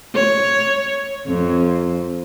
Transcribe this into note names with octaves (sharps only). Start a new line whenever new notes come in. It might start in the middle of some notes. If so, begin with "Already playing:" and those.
C#5
F2